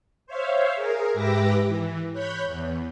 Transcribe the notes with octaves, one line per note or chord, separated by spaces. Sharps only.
C5 C#5 E5 F5
G#4 A#4
G#2 G4 B4 E5 D6 A#6
E3
C#5 B5 F#6 G6
E2